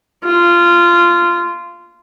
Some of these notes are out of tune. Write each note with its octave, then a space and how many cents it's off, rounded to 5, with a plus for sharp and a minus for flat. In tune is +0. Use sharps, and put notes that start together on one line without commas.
F4 -15